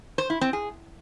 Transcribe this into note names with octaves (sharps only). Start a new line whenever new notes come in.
C5
E4
C4
G#4